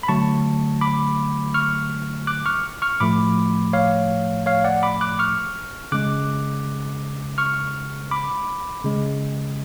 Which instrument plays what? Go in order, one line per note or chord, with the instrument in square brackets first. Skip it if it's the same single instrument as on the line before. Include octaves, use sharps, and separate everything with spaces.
[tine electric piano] B5
D3 F#3 A3 A5 C#6
B5 D6
C#6 F6
D6 F#6
C#6 F6
C#6 F6
A2 F3 A3 B5 D6
C#5 F5
C#5 F5
D5 F#5
B5 D6
D6 F#6
C#6 F6
C#3 G#3 D6 F#6
C#6 F6
B5 D6
C#3 G#3